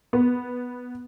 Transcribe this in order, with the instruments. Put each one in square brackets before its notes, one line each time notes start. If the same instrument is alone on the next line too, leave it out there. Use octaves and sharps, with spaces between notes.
[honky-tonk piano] B3